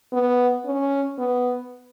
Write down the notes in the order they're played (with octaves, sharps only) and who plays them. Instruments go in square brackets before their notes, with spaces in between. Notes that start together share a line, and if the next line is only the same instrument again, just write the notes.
[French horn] B3
C#4
B3